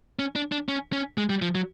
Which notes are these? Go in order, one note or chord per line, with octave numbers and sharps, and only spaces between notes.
C#4
D4
D4
C#4
C#4
G#3
G3
F3
F#3